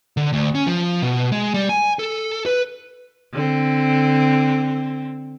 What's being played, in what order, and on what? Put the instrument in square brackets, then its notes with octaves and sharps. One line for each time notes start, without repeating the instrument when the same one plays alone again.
[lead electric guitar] D3
D2
C#4
F3
B2
G#3
G3
G#5
A4
B4
[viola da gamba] D3 C4